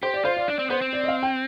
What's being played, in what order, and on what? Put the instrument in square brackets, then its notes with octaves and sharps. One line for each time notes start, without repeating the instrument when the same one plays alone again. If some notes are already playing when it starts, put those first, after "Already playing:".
[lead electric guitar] G4 [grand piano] C5
[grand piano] D5
[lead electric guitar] F4 [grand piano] C5
[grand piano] D5
[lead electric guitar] D4 [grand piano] D5
[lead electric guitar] C4
[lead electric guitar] B3 [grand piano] C5
[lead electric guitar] C4
[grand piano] D5
D#5
F5
G5